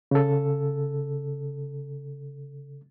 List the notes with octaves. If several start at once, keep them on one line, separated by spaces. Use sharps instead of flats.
C#3 A4